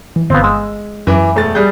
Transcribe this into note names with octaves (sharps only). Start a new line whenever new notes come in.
E3
G1 B3 C4 F5
G#3 E6
F#2 E3 B5 D6
E1 A3 A6
G3 G#4 F#6 G6